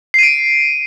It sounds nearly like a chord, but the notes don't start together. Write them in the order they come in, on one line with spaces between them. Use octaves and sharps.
C7 D#7 D7